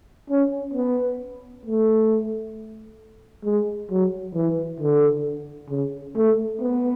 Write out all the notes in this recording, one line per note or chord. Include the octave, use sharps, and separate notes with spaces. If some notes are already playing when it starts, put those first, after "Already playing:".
C#4
B3
A3
G#3
F#3
E3
D3
C#3
A3
B3